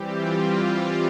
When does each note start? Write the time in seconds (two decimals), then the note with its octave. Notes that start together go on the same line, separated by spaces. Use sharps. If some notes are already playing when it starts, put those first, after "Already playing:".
Already playing: E3 G3 C4 G4
0.19 F4